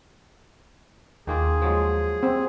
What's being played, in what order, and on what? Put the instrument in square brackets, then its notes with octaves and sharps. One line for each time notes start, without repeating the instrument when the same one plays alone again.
[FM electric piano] D#2 [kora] D#3 A#3 F4 [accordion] G#4
[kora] F3 F#3 G#3
[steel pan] C4 [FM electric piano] F#5